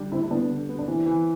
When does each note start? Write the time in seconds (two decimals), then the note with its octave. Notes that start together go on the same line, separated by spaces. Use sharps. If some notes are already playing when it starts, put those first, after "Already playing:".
Already playing: D3 G3 D4
0.12 D3 C4 E4
0.23 E4
0.31 D3 B3 D4
0.50 D3
0.69 B3
0.79 D4
0.87 E3 C4 E4
1.06 E3